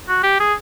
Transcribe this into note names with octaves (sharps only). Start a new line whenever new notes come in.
F#4
G4
G#4